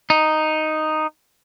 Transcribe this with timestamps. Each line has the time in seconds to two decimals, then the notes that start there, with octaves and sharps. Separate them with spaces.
0.10 D#4